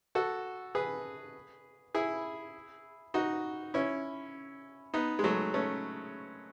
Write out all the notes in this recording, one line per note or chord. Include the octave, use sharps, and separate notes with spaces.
F#4 A4
G#4 B4
E4 G#4
D#4 F#4
C#4 E4
B3 D#4
G#3
F#3 A3
A3 C#4